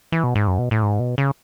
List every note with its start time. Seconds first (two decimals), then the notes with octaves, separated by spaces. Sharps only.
0.12 E3
0.24 B2
0.35 G#2
0.47 F#2
0.59 B2
0.71 A2
0.82 G#2
1.00 B2
1.18 C#3